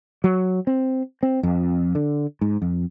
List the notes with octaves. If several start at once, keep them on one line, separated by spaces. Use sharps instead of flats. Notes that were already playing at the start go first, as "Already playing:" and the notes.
F#3
C4
C4
F2
D3
G#2
F2